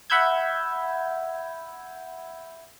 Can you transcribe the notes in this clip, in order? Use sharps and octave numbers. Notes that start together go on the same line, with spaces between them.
E5 F#5 B5 E6 G6 G#6